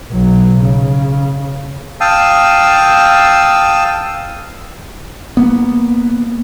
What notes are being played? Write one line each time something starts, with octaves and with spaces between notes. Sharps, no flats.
B1 F#3
C#3
F5 G5 A5 D#6 E6
A#3 B3